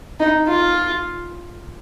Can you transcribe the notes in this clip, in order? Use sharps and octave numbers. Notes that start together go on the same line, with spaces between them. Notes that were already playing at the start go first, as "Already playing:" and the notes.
D#4
F4